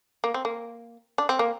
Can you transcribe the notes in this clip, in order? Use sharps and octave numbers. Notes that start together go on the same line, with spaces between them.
A#3
C4
A#3
D4
C4
A#3